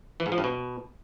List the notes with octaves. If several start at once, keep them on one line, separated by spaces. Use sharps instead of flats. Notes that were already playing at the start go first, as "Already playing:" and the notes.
E3
G#2
F3
G2
B2